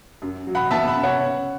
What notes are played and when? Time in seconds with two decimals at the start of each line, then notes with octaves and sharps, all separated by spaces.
0.22 F#2
0.47 F#3
0.55 F#5 B5
0.71 B3 E5 A5
0.88 F#5 B5
0.95 C#3
1.03 C#5 F#5
1.19 C#4